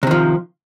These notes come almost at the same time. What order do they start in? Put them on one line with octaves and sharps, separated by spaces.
C3 D#3 F3